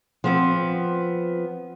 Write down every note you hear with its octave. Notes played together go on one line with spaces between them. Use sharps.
F3 B3 C4